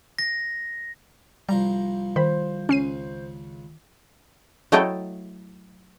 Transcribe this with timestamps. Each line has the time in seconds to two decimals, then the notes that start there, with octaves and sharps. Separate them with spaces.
0.19 A#6
1.49 C2 F3 G3 A#5
2.16 D#3 C5 B5
2.69 C#2 C#4 C7 D#7
4.72 F#3 A3 E4 A4 D#5 G5